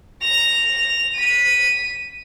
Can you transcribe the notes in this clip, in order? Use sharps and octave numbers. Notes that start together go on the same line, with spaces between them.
A#6 F7
B6 D#7